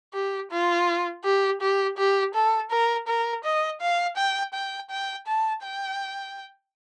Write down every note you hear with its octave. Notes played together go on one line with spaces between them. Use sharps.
G4
F4
G4
G4
G4
A4
A#4
A#4
D#5
F5
G5
G5
G5
A5
G5